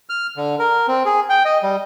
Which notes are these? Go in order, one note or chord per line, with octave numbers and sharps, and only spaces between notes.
F6
D3
A#4
C4
G#4
G5
D#5
G3